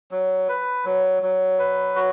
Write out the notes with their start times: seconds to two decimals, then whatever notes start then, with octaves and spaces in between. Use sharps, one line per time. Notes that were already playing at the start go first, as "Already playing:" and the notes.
0.11 F#3
0.49 B4
0.85 F#3
1.22 F#3
1.59 B4
1.96 F#4